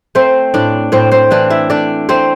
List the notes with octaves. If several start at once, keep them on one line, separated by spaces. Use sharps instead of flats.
A3 C4 C5
A2 D4 D5
A2 C4 C5
C4 C5
E3 D4 D5
E4 E5
A3 D4 D5
A3 C4 C5